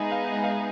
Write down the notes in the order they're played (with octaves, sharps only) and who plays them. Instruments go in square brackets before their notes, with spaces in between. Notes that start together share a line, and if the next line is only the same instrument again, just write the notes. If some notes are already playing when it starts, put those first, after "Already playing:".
Already playing: [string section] G#3 B3 D#4 G#4 [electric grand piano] E5
[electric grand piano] F5
F5